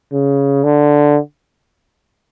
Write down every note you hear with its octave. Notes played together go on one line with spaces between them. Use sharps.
C#3
D3